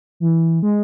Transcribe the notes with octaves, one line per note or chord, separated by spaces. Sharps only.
E3
G#3